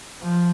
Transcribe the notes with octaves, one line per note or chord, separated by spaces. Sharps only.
F3